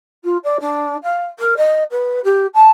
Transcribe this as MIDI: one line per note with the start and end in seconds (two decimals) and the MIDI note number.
0.24 0.37 65
0.43 0.57 74
0.60 0.96 62
1.03 1.25 77
1.39 1.54 70
1.56 1.83 75
1.91 2.20 71
2.24 2.46 67
2.54 2.69 81